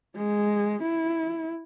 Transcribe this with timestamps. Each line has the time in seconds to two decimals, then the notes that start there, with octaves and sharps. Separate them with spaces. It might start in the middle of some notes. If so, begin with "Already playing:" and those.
0.17 G#3
0.83 E4